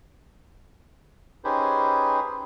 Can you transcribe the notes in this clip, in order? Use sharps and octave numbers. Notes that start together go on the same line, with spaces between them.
C#4 D#4 G4 G#4 B4 C5